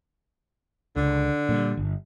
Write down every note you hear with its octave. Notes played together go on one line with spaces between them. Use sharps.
C#2 D3
A#2 F#3 G3
G1